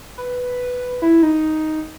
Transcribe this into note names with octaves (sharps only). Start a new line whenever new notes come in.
B4
E4
D#4